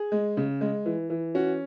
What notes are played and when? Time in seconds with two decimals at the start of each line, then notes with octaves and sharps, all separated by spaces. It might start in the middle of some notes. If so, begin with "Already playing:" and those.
Already playing: G#4
0.12 G#3
0.37 C#3
0.61 G#3
0.86 E3
1.10 E3
1.35 C#4 F#4